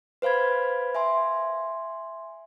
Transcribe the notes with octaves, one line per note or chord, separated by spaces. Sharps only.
B4 C5 F5 B5 G#6
E5 G#5 C6